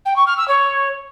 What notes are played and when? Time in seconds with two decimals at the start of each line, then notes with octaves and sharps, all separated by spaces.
0.06 G5
0.16 C#6
0.27 F6
0.37 E6
0.48 C#5